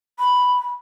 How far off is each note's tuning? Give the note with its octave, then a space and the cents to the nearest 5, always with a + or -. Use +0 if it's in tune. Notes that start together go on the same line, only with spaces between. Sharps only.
B5 +5